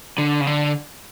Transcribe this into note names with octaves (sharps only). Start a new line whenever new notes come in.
D3
C#3
D3